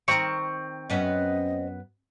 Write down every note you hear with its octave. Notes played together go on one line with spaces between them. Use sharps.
D#3 C4 A#4 C#6
F#2 B3 C#4 D#5